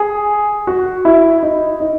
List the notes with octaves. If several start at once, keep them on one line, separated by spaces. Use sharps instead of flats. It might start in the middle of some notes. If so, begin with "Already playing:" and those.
Already playing: G#4
F#4
E4
D#4
D#4